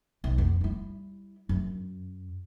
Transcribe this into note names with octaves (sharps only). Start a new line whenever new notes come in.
B1
F2
G3 E4
F#2